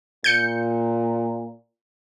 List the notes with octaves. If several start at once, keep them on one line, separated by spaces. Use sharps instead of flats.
A#2 G6 C#7